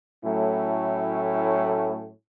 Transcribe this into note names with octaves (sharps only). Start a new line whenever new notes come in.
A2 F#3 A3 C#4 E4